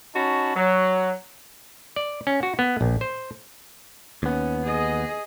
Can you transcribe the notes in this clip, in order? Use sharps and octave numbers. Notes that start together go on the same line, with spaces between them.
C#4 D#4 F#4 A5 B5
F#3
D5
C#4
F#4
B3
A#1
C5
D#2 B3 C#4
G#4 D#5